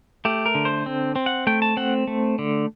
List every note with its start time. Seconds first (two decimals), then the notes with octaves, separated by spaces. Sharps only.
0.25 A3 G4
0.46 A#4
0.55 D3
0.65 C5
0.86 C4
1.16 C4
1.26 F#5
1.47 A3 G5
1.62 A5
1.77 C4 F#5
2.07 A3
2.39 D3